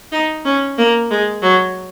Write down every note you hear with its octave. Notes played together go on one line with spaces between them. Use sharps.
D#4
C#4
A#3
G#3
F#3